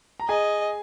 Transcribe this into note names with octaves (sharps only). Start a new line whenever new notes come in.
A#5
G#4 D#5 G#5